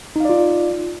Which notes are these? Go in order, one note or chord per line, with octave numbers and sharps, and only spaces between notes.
D#4 F4 D5 F5